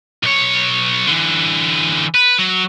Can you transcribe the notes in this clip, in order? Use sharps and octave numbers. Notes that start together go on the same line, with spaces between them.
B1 C#5
D3 E3
B4
F#3